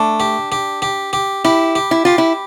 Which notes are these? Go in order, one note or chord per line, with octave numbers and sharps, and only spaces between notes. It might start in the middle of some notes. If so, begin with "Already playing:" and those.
Already playing: A3 D4
G4
G4
G4
G4
E4 G4
G4
E4
F4 G4
E4